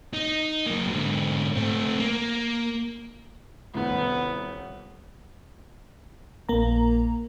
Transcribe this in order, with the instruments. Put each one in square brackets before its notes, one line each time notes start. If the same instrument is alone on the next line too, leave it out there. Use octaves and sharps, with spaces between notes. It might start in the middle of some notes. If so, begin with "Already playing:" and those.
[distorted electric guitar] D#4
F#3 A#3
G#2 D3
A3 C4
A#3
[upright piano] D#1 C2 [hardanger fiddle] B3
[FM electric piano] A#1 A#3 A#5